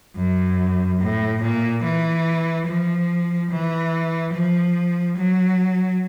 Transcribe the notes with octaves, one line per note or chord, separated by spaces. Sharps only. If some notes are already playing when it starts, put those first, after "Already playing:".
F#2
A2
A#2
E3
F3
E3
F3
F#3